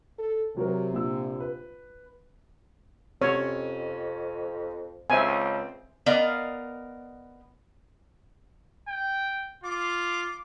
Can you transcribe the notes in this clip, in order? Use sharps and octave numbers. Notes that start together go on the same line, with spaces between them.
A4
C3 F#3 F#4 A#4
A#1 E6
B4
F2 C3 C#4 C#5
C#2 C4 C5 E5 G#5
B3 A#4 D5 D#5 F5
G5
F4 D6